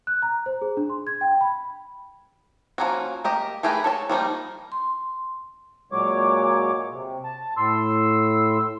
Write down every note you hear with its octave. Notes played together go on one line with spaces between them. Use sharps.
F#6
A#5
C5
G#4
D4
C6
G#6
G5
B5
F3 G#3 A#3 C#4 F#4
A#3 G4 D#5
A3 G4 G#4 A#4 B4
A4 C#5 A5
F3 G3 A#3 D#4
C6
A#2 F#3 G#3 C#5 D6
C3
A5
A2 C6 E6